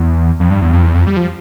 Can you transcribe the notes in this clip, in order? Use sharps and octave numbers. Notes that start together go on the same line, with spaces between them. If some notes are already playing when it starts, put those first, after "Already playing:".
Already playing: E2
F2
G2
E2
F2
E2
F2
G3
F3